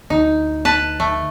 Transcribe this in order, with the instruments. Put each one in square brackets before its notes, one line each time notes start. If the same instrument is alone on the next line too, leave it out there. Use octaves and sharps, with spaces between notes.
[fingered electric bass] D2 [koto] D#4
[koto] B4 A5
A3